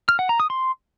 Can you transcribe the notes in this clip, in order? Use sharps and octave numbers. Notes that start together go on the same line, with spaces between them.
F6
F#5
A#5
D#6
C6